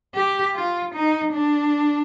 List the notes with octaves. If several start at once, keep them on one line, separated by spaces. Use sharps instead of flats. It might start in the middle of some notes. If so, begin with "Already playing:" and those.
G4
F4
D#4
D4